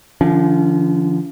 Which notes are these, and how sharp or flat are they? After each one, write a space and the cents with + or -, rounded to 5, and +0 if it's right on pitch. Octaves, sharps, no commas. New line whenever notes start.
D3 +15 F3 -35 C#4 +35